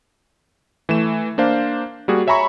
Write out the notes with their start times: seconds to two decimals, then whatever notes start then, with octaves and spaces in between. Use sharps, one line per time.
0.89 E3 A3 E7
1.38 A#3 D4 C5 F5
2.08 G3 A#3 F#4 G#4
2.27 C#5 E5 G#5 A#5 B5 C#6